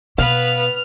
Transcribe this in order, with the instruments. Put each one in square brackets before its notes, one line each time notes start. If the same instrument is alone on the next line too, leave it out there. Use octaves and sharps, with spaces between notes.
[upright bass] B2 [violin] B3 B4 [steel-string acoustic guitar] F5 [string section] F6